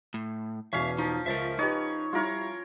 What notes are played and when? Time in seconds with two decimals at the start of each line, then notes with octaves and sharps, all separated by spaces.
0.14 A2
0.73 E2 B2 C#4 E5 F5
0.98 F3 D#4
1.26 C#2 A#4 C5 E5 A6
1.59 D#4 G4 B4 C#5 D#5
2.13 G3 E4 F4 A#4 C#5